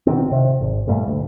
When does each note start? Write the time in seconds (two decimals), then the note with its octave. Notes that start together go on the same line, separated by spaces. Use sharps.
0.07 B2 D#3 C4
0.32 C3
0.61 G#1
0.87 G2 A#2 G3 A3
1.07 D2